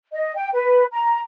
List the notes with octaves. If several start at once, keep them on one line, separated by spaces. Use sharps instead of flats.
D#5
G5
B4
A#5